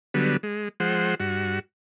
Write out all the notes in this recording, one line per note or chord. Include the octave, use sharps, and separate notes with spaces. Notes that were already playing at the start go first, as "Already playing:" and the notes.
D3 F#3 G3 B3
G#3
F3 G#3 C5 F#5
G2 F#4